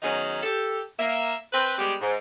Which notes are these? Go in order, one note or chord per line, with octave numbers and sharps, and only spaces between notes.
D#3 F#3 B3 C#4 D#4 G#4
G4 A4
A#3 E5
C4 B4
G3 G#3 B3 G4
G#2